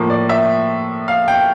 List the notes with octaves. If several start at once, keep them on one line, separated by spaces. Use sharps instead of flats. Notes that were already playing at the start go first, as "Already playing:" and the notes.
Already playing: A2 F3 A#3
D5
E5
F5
G5